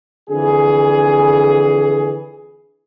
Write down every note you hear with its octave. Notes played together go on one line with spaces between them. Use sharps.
F2 D3 E3 G#4